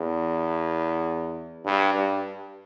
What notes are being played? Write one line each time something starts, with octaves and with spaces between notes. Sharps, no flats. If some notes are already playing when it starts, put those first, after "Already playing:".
Already playing: E2
G2
G2